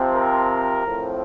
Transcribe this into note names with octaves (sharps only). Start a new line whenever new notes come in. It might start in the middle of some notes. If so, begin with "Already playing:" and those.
Already playing: C3 F3 C4
A#4
A2 F3 C4